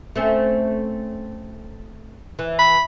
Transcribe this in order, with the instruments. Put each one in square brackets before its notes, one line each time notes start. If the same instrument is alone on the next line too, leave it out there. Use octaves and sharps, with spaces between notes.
[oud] A3 C4 C#4
E3
[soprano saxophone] B5